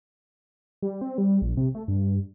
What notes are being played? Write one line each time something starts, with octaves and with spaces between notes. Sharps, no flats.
G3
C4
G3
A#1
C3
A3
G2